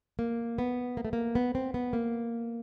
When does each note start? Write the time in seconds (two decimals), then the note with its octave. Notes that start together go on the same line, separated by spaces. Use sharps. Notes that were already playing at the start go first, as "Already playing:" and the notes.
0.19 A#3
0.58 B3
0.97 A#3
1.05 A3
1.13 A#3
1.35 B3
1.55 C4
1.74 B3
1.93 A#3